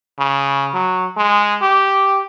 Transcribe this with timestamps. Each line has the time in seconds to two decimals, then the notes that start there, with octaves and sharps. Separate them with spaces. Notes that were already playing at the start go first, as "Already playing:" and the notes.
0.19 C#3
0.74 F#3
1.17 G#3
1.62 G4